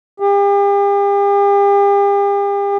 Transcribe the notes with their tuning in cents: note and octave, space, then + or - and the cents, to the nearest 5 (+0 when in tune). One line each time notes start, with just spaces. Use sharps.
G4 +40